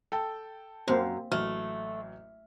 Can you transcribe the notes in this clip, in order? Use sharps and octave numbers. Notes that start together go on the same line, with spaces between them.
A4 G5 A5
F#2 A#3 C4 C5
A1 F#3 A3 F6